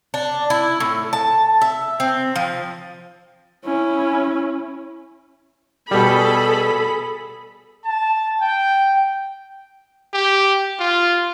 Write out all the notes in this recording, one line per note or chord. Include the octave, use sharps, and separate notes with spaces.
D4
E4
A2
A5
E5
C4
F3
C#4 E4
B2 G3 G#4 A4 B5
A5
G5
G4
F4